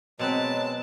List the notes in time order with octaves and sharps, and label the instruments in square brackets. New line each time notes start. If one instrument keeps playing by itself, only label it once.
[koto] B2 C4 B4 [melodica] F#3 G#3 [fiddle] A5